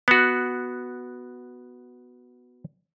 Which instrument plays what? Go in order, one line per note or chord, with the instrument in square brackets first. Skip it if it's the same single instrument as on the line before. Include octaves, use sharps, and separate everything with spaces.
[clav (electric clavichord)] B3 F#4